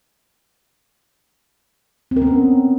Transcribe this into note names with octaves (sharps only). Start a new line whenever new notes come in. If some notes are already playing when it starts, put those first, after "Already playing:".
C4
A#4
B3
C#4